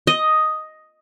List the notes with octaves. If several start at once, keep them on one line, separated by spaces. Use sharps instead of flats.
D#5